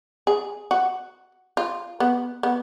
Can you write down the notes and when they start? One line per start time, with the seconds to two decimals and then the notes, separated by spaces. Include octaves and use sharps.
0.27 G#4
0.71 F#4
1.57 F4
2.00 B3
2.43 B3